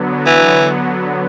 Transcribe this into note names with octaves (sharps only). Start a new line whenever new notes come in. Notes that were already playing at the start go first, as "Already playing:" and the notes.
Already playing: D3 F#3 B3
E3